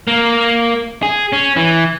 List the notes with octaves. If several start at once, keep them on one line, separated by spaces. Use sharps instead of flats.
A#3
G#4
C#4
E3